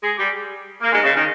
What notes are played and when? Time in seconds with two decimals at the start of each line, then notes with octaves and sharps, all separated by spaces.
0.03 G#3 G#4
0.17 G3 G4
0.81 A#3
0.92 G#2 G#3
1.04 C#3
1.15 D#3